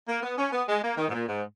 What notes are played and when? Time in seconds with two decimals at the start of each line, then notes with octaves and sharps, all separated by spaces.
0.08 A#3
0.23 B3
0.37 C#4
0.52 B3
0.67 G#3
0.82 A#3
0.97 D#3
1.08 G#2
1.11 A#2
1.27 G#2